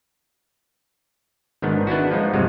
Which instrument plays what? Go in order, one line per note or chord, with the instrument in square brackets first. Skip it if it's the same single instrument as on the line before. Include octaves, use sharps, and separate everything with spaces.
[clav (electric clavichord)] G#1 G#2 D#3 B3 D4
B3 D4 E4 F#4
F3 G#3 D#4
G1 E2 C3 F#3 G#3